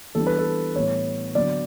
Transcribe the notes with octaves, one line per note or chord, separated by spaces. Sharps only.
E3 G3 B3 D4 A4
B4
A4
A2 E3 G3 B3 C#5
D3 F#3 B3 D5